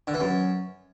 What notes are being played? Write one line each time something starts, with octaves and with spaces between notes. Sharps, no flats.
D3
E3
F#2